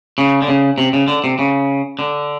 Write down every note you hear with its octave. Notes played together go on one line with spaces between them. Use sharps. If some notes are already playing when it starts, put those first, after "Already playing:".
C#3
D3
C#3
C3
C#3
D3
C3
C#3
D3